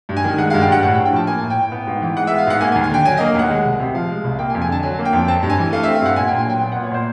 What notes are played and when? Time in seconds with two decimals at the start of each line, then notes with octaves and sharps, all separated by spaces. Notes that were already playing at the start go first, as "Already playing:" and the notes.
0.09 G2
0.17 G#5
0.24 D#3
0.38 G#3 F#5
0.50 G2 F5
0.61 G5
0.68 G2 F#5
0.83 A2 F#5
0.94 G5
0.98 A2
1.06 G5
1.13 F3 A5
1.27 A#3 G#5
1.43 A2
1.50 G5
1.57 A2
1.72 B3
1.87 G#2
2.02 E3
2.17 G#3 F#5
2.27 B3 E5
2.38 F5
2.47 G#2 F#5
2.61 A#3 G#5
2.72 G#5
2.75 D#2
2.84 G#5
2.91 D3 G5
3.05 F#3 G#5
3.17 A#3 D#5
3.35 D#2 F#5
3.50 G#3
3.65 C2
3.80 C3
3.94 F3 F5
4.09 G#3
4.24 C2
4.39 A#3 G5
4.50 G#5
4.54 F2
4.62 G#5
4.68 D3 A5
4.83 F#3 G#5
4.99 A#3
5.05 G5
5.13 F2
5.28 C4 A5
5.43 G2
5.50 G#5
5.58 E3
5.72 A3 F5
5.83 C4 E5
5.95 F5
6.02 G2 F#5
6.16 A#2 G#5
6.28 A#2 G5
6.39 G#5
6.46 F#3 G5
6.61 B3
6.72 A#2 F#5
6.84 C#5
6.91 A#2 C5